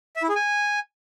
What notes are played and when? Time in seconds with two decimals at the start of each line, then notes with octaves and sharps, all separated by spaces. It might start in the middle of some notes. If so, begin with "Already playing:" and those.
0.16 E5
0.23 E4
0.29 G#4
0.36 G#5